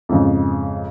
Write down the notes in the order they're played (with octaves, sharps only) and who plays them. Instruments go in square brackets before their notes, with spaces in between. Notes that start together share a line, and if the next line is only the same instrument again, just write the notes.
[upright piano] F2 G#2 C#3